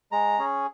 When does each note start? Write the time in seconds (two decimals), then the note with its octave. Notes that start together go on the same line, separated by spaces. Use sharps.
0.12 G#3 A#5
0.39 C#4 G#4